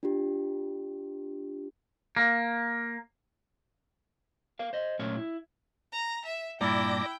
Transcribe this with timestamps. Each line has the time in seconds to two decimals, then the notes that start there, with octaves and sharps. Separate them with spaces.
0.03 D4 F4 G4
2.17 A#3
4.59 A#4 F5
4.73 C5 D#5
4.99 A#2 F#3 A3 C#4 A#4 C#5
5.16 E4
5.92 A#5
6.25 E5
6.61 G2 A#2 E4 D5 G5 D6 A#6